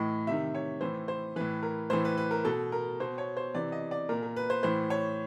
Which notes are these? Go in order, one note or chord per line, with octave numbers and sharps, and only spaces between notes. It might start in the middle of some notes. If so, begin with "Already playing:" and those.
Already playing: A2 E3 D#5
C3 D#3 E5
C#5
A2 E3 C5
C5
A2 E3 B4
A#4
A2 E3 C5
B4
B4
A#4
B2 A4
A#4
B2 C5
C#5
C5
C3 E3 D5
D#5
D5
A#2 A#4
A#4
B4
C5
A2 E3 C5
C#5